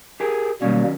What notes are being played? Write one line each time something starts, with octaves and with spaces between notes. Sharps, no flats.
G4 G#4 A#4
B2 D#3 F#3 G3 A#3 C#4